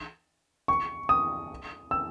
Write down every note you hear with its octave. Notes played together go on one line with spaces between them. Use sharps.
C#6
D#6
E6